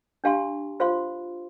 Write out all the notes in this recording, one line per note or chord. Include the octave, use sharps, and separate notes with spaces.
D4 G4 F5 A5 C6
F4 C5 F5 C6